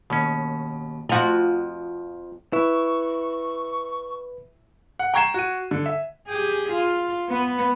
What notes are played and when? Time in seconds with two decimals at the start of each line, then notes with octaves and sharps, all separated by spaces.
0.10 D#2 B2 C#4
1.09 F2 F3 F4 F#4
2.53 E4 B4 C#6
4.99 F#5
5.14 G5 A#5 C#6 G#6 C7 E7
5.34 F#4 D#7
5.71 D3
5.86 E5
6.28 G4 G#4
6.72 F4
7.29 B3 B4